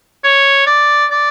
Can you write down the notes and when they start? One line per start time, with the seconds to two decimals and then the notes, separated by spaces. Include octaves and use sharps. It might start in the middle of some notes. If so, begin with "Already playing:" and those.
0.24 C#5
0.67 D5
1.10 D5